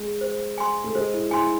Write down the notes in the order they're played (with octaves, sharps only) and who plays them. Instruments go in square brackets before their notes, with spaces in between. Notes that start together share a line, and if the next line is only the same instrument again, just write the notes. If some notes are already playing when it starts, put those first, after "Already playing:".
Already playing: [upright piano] G#3
[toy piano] C5
G#5 C6
[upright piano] A3
[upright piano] G#3 [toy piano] C5
[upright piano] E4
[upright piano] E4 [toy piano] G#5 C6